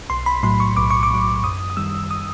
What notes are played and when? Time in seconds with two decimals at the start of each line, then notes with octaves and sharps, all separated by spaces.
0.10 B1 C6
0.26 B5
0.43 A2 F#3 C6
0.60 C#6
0.77 B1 D6
0.90 C#6
1.03 D6
1.10 A2 F#3
1.43 F#2 D#6
1.70 D#6
1.77 D#3 G3 E6
2.11 D#6